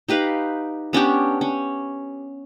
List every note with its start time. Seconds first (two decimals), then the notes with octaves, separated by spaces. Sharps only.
0.09 D#4 G4 B4 F5
0.93 B3 C#4 D4 G4
1.41 C#4